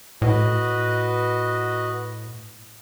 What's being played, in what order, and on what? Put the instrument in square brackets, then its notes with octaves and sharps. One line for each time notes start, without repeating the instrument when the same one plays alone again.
[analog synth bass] A2 [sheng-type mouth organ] F#4 B4 D#5